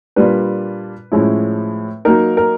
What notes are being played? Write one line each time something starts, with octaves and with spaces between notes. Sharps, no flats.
A#2 G3 A#3 D4 F4 B4
A2 F3 G#3 C#4 E4
F#3 A#3 D#4 A#4
A#4